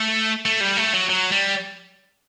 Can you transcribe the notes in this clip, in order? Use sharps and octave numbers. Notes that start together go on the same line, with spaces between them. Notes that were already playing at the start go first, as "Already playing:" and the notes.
Already playing: A3
A3
G3
A3
F#3
F#3
G3